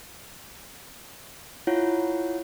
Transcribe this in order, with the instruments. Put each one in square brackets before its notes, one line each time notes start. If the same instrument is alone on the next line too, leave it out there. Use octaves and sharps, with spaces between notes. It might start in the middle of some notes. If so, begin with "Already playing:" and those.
[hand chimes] E4 F4 C#5 F#5